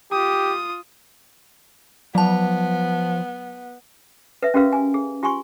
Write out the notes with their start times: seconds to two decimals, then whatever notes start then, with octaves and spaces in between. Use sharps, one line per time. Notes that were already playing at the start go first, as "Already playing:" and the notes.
0.12 F4 G4 D#6
2.15 F3 F#3 B3 A5
4.43 B4 E5
4.54 C#4 F#4 G4 A#4 B4 F5
4.73 G#5
4.94 G#4
5.23 F4 G4 G#5 C6 C#6